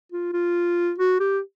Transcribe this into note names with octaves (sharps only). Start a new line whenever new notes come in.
F4
F4
F#4
G4